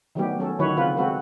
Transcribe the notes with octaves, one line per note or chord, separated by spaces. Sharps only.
D#3 F#3 G3 A3 B3 G4
F#3 C#4 A4
D3 D#3 F#3 E4 B4 C#5
C#3 C4 F4 B4
G#3 C4 F#4 A4 B4